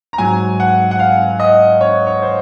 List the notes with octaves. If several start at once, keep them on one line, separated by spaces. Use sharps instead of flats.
A#5
G#2 F#3 G#5
F#5
F#5
F5
D#5
C#5
C#5
C5